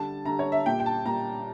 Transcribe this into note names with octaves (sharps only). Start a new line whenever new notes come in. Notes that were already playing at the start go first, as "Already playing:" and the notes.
Already playing: D3 G3 A5
D3 G3 A#5
C#5
E5
A#2 G3 G5
G5
A5
A#2 G3 A#5